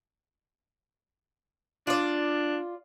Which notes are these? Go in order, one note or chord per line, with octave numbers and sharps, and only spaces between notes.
D4 F4 D5